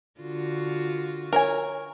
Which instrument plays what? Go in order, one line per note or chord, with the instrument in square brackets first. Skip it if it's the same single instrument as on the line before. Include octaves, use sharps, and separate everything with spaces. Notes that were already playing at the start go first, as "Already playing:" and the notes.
[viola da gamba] D3 F4 F#4
[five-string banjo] A#4 C#5 G#5